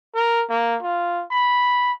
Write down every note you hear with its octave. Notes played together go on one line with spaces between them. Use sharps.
A#4
A#3
F4
B5